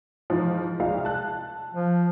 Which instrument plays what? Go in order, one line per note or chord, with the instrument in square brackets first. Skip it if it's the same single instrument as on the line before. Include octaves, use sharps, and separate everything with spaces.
[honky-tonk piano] G#2 E3 F3
C2 G#3 F5
A5 F#6
[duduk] F3